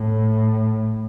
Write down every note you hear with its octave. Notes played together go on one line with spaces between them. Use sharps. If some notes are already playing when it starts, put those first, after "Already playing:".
Already playing: A2